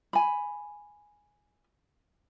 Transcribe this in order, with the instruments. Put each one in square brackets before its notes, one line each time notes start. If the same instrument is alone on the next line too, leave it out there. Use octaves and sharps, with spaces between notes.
[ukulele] G#5 B5